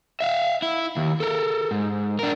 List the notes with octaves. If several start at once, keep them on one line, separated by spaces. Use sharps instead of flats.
E5 F5
E4
D#2
A4 A#4
G#2
D4 A#4